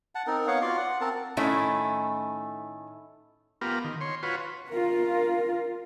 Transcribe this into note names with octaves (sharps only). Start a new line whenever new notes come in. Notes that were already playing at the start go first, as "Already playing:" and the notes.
F#5 A5
C4 D#4 A#4
B3 C#5 F5 F#5
F4 F#4 D5 F5
F#5
C4 A#4 A5
A2 D#3 A3 C#4 E4
B3 F4 G4 A#4
D#3
C#5 C6
F4 F#4 B4 C#5
F4 A#4